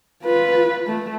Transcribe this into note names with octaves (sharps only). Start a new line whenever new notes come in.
F4 B4
A3